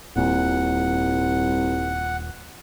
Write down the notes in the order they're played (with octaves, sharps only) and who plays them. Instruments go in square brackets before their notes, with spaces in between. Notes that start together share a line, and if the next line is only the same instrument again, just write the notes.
[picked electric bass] D#1 A#2 [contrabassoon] C2 [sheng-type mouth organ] F#5